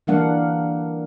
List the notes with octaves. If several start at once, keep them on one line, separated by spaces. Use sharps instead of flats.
E3 G3 A#3 D4 F5 F#5